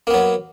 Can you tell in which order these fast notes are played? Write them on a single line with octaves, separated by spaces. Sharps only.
A#3 B3 F#3